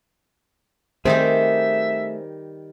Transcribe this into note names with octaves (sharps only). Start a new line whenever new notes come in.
D#3 G3 A3 C4 D#4 G#4 E5